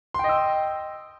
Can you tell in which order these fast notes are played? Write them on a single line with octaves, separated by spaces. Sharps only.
C6 G5 D#5 E6